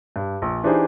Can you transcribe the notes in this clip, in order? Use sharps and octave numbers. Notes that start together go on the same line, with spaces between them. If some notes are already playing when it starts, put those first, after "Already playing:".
G2
A#1
E3 D4 D#4 G4 G#4 C5